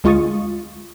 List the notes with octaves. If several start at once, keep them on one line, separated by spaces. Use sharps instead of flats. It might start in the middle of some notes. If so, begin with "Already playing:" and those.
D2 G#3 F4 C#6 D#6 A6